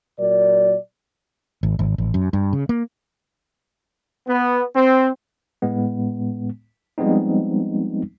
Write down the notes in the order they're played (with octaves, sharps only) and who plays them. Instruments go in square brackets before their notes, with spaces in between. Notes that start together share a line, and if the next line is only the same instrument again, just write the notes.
[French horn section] A#2 F#3 A#4 D5
[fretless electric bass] G#1
G#1
A1
F#2
G2
C#3
A#3
[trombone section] B3
C4
[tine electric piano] A2 G#3 B3
F3 G3 G#3 B3 C4 D#4